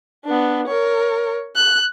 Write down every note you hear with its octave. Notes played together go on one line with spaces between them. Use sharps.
B3 D4
A#4 C#5
F#6